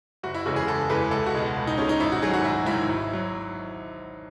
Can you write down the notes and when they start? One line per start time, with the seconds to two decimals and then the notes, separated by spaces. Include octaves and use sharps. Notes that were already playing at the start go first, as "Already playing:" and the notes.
0.23 F#1 F#4
0.34 E4
0.46 E2 C#3 E3 G#3 F#4
0.56 G#4
0.67 F#1 A4
0.89 E2 C#3 E3 G#3 B4
1.11 C#2 A4
1.26 F#4
1.34 B2 G#3
1.56 C#2
1.67 D#4
1.78 B2 G#3 C#4
1.89 D#4
2.00 G#1 E4
2.12 F#4
2.22 G#2 D#3 F#3 G#4
2.34 F#4
2.44 G#1 E4
2.66 G#2 D#3 F#3 E4
2.89 G#1
3.13 F#3